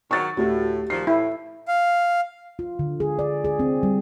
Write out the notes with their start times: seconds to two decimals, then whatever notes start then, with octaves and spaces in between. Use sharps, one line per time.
0.11 D#3 F#3 C#6 A6
0.37 D2 A2 F#4 G4
0.90 A#2 D#3 F3 C7
1.07 A2 E4
1.68 F5
2.59 F4
2.79 D3
3.00 G#4
3.19 D5
3.45 G#4
3.59 C4
3.83 G3